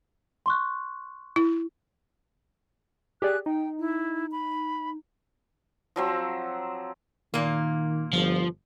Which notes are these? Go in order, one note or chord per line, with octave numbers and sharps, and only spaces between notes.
C6 C#6 F#6
E4
G4 G#4 D5 F#6
D#4 G5
E4
B5
F3 F#3 C4
A#2 D#3 A#3
G1 F3